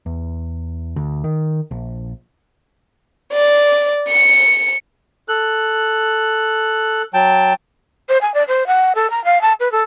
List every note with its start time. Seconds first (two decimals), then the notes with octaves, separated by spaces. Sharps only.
0.06 E2
0.96 D2
1.24 D#3
1.71 A#1
3.33 D5
4.08 C#7
5.28 A4 F#6
7.14 F#3 G5 A5
8.09 C5
8.21 G#5
8.34 D5
8.47 C5
8.66 F#5
8.95 A4
9.10 A#5
9.24 F5
9.41 A5
9.59 B4
9.71 A4